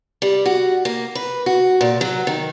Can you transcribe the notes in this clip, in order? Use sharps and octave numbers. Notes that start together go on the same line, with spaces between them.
G3
F#4
A#3
B4
F#4
A#2
F#3
D#3